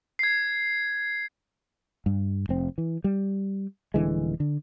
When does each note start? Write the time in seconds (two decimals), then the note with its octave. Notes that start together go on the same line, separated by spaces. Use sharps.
0.19 G#6 C7
2.06 G2
2.49 F1 C4
2.78 E3
3.04 G3
3.94 D#1 D3 E3 G#3
4.40 D3